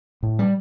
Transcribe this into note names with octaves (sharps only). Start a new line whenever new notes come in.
A2
G3